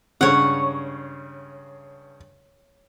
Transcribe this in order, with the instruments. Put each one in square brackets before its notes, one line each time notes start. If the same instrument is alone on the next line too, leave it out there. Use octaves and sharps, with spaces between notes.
[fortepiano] G2 C#3 [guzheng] C#5 F#5